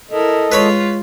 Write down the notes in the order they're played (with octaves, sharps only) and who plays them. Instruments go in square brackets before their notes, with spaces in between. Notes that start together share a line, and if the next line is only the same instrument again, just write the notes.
[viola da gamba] E4 A#4 [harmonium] A4 D#5
[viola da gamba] G#3 F4 [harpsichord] B4 C#5 B5